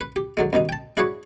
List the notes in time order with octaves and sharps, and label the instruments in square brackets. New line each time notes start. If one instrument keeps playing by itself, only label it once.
[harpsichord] B4
G4
D3 F#3 G#3
C2 B2 D#3 D#4
G5 A5
D4 E4 F#4 G#4 B4 C#5